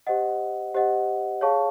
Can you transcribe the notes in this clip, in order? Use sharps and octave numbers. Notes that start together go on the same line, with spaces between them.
G4 C5 D#5 F#5
G4 C5 D#5 F#5
G#4 C#5 F5 A5 C#6